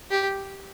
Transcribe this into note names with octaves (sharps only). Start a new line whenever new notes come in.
G4